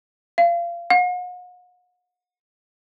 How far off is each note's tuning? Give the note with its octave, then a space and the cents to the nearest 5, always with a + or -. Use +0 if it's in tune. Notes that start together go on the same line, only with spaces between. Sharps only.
F5 -25
F#5 -40